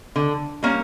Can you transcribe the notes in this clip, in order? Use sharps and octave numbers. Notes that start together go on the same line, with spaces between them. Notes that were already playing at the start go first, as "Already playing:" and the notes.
D3
G3 A#3 C#4